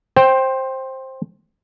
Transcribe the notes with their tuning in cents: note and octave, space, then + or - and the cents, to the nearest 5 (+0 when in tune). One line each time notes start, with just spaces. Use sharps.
C5 +15 G5 +0